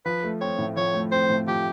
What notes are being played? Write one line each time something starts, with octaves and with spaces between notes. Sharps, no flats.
F3 B4
A3
C4 C#5
A2
F3 C#5
A3
C4 C5
A2
F3 G4